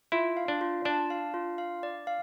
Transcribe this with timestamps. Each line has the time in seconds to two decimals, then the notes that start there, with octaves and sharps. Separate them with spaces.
0.12 E4 F4
0.37 F5
0.48 D4
0.61 F4
0.85 D4 A5
1.10 F5
1.34 F4
1.58 F5
1.83 D5
2.07 F5